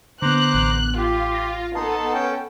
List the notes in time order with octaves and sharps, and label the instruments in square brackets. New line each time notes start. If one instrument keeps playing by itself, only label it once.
[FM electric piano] D3 B3 [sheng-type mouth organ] C5 A#5 D6 [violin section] F#6
[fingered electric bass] A1
[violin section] F4 [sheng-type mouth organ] G4
[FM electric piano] A#6
[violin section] B3 A4 [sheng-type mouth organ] D#4 D#5 C6 [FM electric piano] A5
[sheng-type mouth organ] C#4 G5